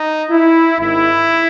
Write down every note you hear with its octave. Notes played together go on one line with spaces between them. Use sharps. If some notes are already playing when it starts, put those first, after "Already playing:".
Already playing: D#4
E4
G#1 G#2 D#3 E4